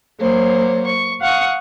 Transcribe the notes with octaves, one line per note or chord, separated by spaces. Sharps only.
F#3 A#3 C5 C#5
C#6
F5 F#5 C#6 D#6